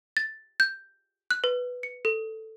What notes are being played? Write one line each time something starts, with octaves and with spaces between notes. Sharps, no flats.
A6
G6
F#6
B4
C#7
A4